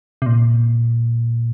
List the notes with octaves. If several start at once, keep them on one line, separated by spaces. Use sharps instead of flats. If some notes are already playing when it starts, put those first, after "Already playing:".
C3
A#2